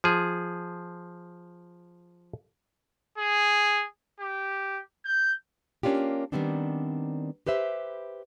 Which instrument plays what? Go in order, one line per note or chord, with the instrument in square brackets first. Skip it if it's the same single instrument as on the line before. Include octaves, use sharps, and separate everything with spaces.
[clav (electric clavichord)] F3 G#4
[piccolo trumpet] G#4
G4
G6
[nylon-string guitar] A#3 C#4 D4 F4 G4
D#3 G3 A3 B3 C4 D4
G4 B4 C5 E5